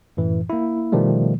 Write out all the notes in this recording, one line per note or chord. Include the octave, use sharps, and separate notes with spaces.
F#2 A2 E3
A#3 E4
B2 D#3 F3 G3 A3